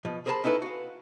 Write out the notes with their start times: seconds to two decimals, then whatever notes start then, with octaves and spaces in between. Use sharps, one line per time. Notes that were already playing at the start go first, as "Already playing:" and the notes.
0.05 B2 F3
0.26 G#4 A#4 C5 C#5 A5 B5
0.44 C#4 D#4 E4 A4 B4
0.62 F#4 F5